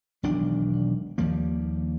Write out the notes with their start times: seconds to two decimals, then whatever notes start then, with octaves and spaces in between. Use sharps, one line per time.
0.23 E1 B1 D#3 D4
1.18 D#2 F3 G3 A#3